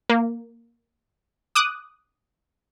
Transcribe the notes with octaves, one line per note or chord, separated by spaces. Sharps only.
A#3
D6 D#6 F#6